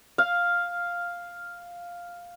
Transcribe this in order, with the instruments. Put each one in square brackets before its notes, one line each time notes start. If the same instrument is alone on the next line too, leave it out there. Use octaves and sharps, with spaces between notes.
[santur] F5